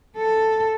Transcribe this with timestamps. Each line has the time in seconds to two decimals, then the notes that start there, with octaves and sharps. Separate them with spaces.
0.17 A4